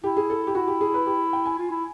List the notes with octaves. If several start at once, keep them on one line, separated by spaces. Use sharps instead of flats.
E4 G4
G#4
A4
G4
E4 F#4
G4
G#4
B4
G4
G5
G#5
F4
E4